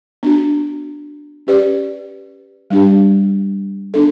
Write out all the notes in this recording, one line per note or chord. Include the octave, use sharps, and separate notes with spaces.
B3 D4 F#4
C#4 G4 B4 D5
G3 D4 G4
B3 D4 A4